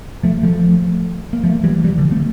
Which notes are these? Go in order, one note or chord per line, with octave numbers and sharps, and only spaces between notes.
F3 A3
F3 A3
A#3
F3 A3
E3 G3
E3 G3
D3 F3
A3 C4